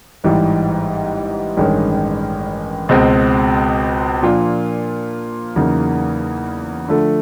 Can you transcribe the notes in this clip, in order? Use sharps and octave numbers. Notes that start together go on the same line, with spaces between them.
A1 G#2 E3 G3
A1 G2 D#3 G#3 C#4
C#2 B2 G#3 C4
A#2 F3 A#3 D4 F4
E2 C#3 F#3 A#3 D#4
D3 F3 A3